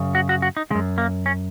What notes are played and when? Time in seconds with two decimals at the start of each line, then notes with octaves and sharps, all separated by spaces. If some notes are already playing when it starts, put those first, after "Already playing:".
Already playing: F#2 C#3
0.15 F#4
0.29 F#4
0.42 F#4
0.57 D#4
0.70 C#3 G#3
0.75 F#2
0.98 A#3
1.26 C#4